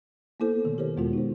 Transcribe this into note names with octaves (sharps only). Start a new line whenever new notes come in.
A#3 B3 E4 A4 C5
B2 D#3 A3
G4 A#4 C5 C#5
E2 B2 G#3 B3 F4 F#4
D#4 C5